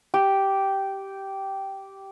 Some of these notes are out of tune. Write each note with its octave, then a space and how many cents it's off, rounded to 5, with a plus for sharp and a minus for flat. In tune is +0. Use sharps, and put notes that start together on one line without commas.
G4 -10